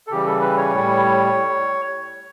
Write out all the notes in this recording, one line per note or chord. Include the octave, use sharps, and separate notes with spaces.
A4
C#3 E3 G3 G4
A4
B4
C#5
A2 G3